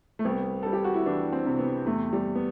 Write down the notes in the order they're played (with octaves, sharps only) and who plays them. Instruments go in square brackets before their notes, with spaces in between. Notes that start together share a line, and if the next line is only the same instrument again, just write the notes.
[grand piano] A3
[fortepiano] C2 [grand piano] B3
[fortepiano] G3 [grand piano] A4
[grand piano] G4
F#4
E4
[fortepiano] E3 [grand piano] D4
[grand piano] C4
[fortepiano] C3
[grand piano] B3
[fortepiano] E2 [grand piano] A3
[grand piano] G3
B3